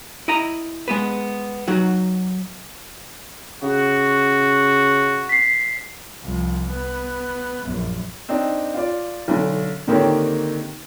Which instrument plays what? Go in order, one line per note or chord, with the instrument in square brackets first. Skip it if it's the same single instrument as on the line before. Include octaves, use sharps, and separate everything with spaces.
[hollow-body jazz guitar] E4 D#5 A#5
G#3 B3 B4
F#3 D#4 F#4
[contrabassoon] C#3 [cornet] F#4
[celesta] B6 C7
[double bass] C2 F3
B3
A#1 F#2
[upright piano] C4 D4 D#4
F4 D5
B1 D3
D3 D#3 A#3 C4 G4 C#5